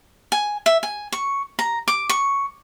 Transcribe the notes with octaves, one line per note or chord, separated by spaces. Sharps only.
G#5
E5
G#5
C#6
A#5
D6
C#6